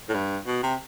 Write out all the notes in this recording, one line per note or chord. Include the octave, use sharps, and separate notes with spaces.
A2
G2
B2
C3